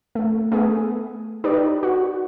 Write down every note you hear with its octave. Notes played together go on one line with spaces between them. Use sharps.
A3
A3 B3 G#4
D#4 G4 B4 D5
F#4